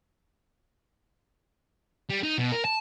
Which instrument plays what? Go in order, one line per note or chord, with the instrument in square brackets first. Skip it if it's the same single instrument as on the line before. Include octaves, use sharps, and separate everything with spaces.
[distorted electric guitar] G3
D#4
B2
A#4
A5